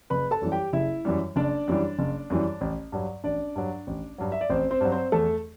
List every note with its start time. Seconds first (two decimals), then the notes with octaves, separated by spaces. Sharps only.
0.10 F#1 B4 B5
0.31 A4 A5
0.41 F#2 E3 G3
0.52 G4 G5
0.73 F#1 E4 E5
1.05 F#2 E3 G3
1.36 F#1 D4 D5
1.68 F#2 E3 G3
1.99 F#1
2.30 F#2 E3 G3
2.61 A1
2.92 G2 F#3
3.24 A1 D4 D5
3.56 G2 F#3
3.87 A1
4.18 G2 F#3
4.32 E5
4.41 D5
4.50 A1 C4 C5
4.71 C4 C5
4.81 G2 F#3
4.92 C4 C5
5.12 E2 A3 A4